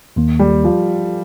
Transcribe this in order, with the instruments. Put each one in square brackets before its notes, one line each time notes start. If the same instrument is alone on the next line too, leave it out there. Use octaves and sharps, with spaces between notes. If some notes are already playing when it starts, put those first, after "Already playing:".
[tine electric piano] D#2 D#3 A#3
[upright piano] G3
F3